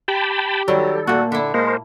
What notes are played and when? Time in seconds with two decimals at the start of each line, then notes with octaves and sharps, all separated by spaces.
0.08 G4 G5 A5 B5
0.68 D#3 F#3 G3 A4
1.07 A#2 A3 A#3 F#4
1.32 D3 E4 E5
1.54 G#3 A#3 A#4 C5